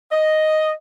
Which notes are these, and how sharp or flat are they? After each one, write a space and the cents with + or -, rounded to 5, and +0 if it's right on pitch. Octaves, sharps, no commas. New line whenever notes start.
D#5 +0